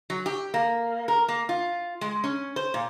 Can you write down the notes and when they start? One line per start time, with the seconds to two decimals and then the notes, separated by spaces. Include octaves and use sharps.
0.10 F#3
0.26 G4
0.54 A#3
1.08 A#4
1.28 A#3
1.49 F4
2.01 G#3
2.24 C#4
2.56 C5
2.74 A#2